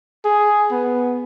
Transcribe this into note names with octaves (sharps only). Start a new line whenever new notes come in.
G#4
B3